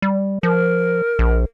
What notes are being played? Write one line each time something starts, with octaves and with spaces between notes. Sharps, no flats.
G3
F3 A#4
A#1